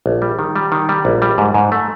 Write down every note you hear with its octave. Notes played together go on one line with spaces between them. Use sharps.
A#1
G3
D#3
G3
D#3
G3
A#1
G3
G#2
G#2
A3